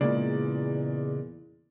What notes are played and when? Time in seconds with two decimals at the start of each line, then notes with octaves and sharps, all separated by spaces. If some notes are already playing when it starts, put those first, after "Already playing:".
0.01 E2 A#2 C#3 G#3 A#3 D5